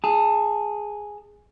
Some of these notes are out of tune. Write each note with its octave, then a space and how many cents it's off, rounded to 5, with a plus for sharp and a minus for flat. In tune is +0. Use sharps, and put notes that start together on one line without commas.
G#4 +0 A5 +20